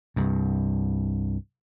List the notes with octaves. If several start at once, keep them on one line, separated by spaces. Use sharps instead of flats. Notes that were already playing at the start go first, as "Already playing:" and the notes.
C2 G2